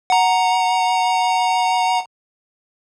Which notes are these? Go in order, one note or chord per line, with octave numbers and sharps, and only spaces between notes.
F#5 A#5